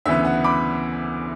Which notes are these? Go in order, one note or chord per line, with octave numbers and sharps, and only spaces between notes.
D2 C#3 E3 B3 E5
F#5
B5 D6